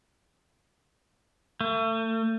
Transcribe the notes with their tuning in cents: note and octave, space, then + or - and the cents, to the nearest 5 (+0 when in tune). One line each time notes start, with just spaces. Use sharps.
A3 +35